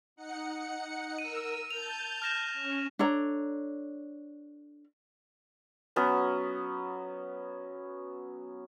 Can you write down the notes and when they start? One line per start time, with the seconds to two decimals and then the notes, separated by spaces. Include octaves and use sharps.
0.16 D#4 F#5 C#7
1.19 A#4 E6 D#7
1.71 A5 G6 F7
2.22 F6 A#6 E7
2.53 C#4
2.99 D4 A4 C#5 A#5
5.96 F#3 B3 C#4 F#4